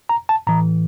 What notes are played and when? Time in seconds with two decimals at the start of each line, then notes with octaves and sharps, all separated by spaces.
0.09 A#5
0.29 A5
0.47 A2 E3 A#5